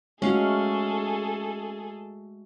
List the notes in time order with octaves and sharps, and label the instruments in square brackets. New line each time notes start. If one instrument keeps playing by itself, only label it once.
[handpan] G#3 A3 F#4 [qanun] C#4 F5 [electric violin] G#4 A4